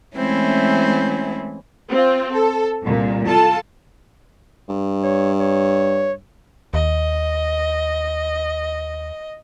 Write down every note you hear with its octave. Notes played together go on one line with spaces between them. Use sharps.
E3 G#3 A3 C4 C#4 E4
C4 F4
A4
C2 A#2
F4 A4 A5
G2
C#5
C#5
D#2 D#5